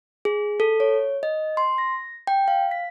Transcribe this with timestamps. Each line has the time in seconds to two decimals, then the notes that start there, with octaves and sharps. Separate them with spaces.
0.25 G#4
0.60 A4
0.80 C#5
1.23 D#5
1.57 C6
1.78 A#6
2.27 G5
2.48 F5
2.71 B6